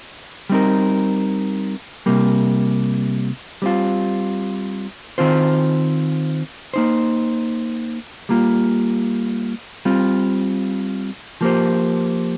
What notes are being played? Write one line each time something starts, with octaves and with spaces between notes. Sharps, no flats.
G3 C4 D#4 A#4
C3 G3 A#3
G3 C4 F4
D#3 C4 F4 C5
A#3 D#4 C5
G3 A#3 F4
G3 C4 F4
F3 A#3 G4 C5